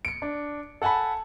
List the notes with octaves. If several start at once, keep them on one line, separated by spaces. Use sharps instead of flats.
C#7 D7
D4
A4 F#5 G#5 A5 B5